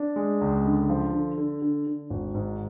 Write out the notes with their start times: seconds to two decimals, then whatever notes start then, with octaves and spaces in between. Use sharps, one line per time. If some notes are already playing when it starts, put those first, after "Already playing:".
Already playing: D4
0.16 G#3
0.41 C#2
0.65 D3
0.89 F3
1.13 D3
1.38 D3
1.62 D3
1.87 D3
2.10 G#1
2.34 G#2